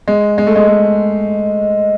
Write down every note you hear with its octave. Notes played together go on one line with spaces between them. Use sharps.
G#3
G#3
A3
G#3
A3